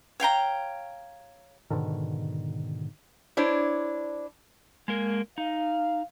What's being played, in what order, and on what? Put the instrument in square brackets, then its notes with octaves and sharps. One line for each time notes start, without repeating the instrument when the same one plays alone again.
[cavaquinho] C#5 F5 G5 A#5
[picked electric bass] G#2 B2 D3 D#3
[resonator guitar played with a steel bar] D4 E4 C5 C#5
[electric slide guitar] G#3 A#3 A#4
[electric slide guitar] D#4 [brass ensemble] F5